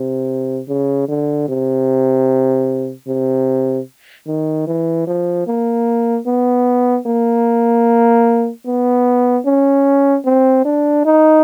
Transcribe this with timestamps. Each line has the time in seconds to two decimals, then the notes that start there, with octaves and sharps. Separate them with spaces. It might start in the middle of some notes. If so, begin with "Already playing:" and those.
Already playing: C3
0.68 C#3
1.08 D3
1.48 C3
3.07 C3
4.27 D#3
4.67 E3
5.07 F3
5.47 A#3
6.27 B3
7.07 A#3
8.66 B3
9.46 C#4
10.25 C4
10.65 D4
11.05 D#4